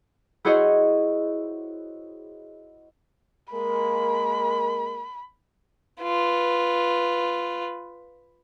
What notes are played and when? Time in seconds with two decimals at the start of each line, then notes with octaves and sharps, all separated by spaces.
0.45 E4 F#4 G#4 C5 C#5 D#5
3.53 G#3 A#3 A#4 B5
6.01 F4 B4